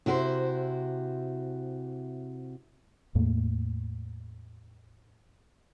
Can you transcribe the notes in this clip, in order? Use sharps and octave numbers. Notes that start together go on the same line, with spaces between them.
C3 E4 F#4 B4 C5
E2 A2 A3 A#3